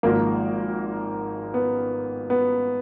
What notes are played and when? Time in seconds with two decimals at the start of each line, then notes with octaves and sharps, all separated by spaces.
0.03 G#1 G#2 F3 A#3 A#4
1.54 B3
2.30 B3